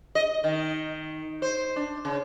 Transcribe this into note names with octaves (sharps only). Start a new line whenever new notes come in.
D#5
D#3
C5
D4
C#3